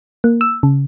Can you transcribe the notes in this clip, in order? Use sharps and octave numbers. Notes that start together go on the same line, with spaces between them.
A#3
E6
C#3